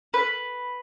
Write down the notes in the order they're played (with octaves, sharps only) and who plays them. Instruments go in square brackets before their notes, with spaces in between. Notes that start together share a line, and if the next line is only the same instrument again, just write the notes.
[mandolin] B4